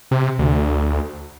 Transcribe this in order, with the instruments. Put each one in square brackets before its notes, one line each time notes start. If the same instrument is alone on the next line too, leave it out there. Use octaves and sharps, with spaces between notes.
[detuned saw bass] C3
D2